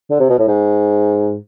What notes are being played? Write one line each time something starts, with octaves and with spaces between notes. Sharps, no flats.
D3
C3
B2
A2
G#2